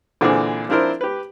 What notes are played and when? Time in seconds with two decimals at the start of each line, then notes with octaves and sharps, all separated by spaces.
0.21 A#2 D3 E3 C4 G#4
0.69 F3 C4 D4 E4 A#4 C5
1.01 G4 B4